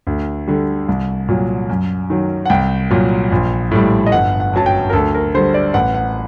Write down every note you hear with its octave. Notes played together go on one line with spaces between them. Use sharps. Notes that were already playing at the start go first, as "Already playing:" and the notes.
D2
D3 G3
C2
A#2 F#3
F#2
D#3 F#3
F#5
C2 G5
A#2 F#3
A#1
A2 G3
D#5
G1 F#5
F#5
F#2 F#3 A5
G5
A#4
D2 A4
A#4
D3 G3 C5
D5
A1 F#5
F#5